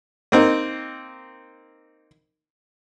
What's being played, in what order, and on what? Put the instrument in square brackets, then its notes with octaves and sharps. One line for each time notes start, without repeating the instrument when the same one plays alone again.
[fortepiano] A#3 C4 D#4